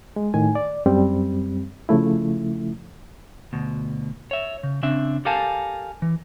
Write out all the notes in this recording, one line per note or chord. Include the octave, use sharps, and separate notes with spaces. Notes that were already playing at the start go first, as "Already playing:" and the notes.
G#3
A2 D#3 G#5
D5
F#2 G3 C4
C#3 F3 A3 E4
D2 B2
C#5 E5
C#3
C#3 C4 D4 E5
G4 A4 A#4 F5 G#5 A5
E3